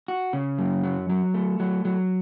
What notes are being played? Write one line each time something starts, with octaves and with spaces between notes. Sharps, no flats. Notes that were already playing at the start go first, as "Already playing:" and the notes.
F#4
C#3
F#2
F#3
F#3
A3
F#3
F#3